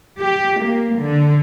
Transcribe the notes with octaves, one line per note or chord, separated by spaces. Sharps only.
G4
A#3
D3